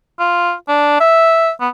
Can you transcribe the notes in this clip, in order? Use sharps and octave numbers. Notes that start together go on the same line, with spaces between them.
F4
D4
E5
B3